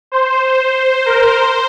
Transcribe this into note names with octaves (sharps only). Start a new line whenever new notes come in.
C5
C5
A#4
C5